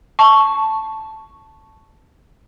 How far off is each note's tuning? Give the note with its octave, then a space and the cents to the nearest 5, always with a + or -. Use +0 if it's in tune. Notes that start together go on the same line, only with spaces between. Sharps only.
A5 +0 C#6 +0